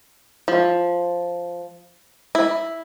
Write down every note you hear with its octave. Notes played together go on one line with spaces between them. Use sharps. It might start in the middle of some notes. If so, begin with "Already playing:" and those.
F3
E4